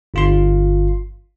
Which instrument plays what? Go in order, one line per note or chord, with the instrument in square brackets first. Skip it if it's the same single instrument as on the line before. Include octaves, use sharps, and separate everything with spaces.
[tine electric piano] G1 F4 C6